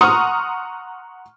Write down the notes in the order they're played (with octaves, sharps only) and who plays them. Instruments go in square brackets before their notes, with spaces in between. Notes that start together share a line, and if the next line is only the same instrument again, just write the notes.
[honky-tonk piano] F#5 A#5 C6 C#6 D#6 F6